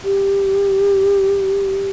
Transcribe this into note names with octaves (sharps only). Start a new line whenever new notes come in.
G4